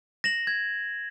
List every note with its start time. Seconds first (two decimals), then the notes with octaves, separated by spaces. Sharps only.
0.24 A#6 E7 F#7
0.47 G#6